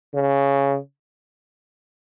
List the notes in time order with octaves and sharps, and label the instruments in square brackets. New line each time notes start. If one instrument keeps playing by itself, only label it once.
[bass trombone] C#3